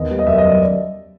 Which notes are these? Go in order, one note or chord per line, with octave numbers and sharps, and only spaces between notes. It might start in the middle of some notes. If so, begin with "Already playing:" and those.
Already playing: D#2 B3 D#5
G3
D#5
F#2 E5
D#5
F#2
D5